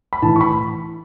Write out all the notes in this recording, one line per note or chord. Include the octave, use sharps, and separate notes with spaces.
B5
A2 E3 A5
C#6
B5